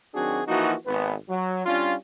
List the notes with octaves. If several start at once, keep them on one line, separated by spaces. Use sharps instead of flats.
D#3 F#3 C4 D4 F#4 G#4
E3 F3 A#3 D#4 F#4
G#1 B3
F#3
G3 C#4 D4 F4